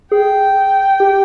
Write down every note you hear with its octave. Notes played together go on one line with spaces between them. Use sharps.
G#4 G5
G4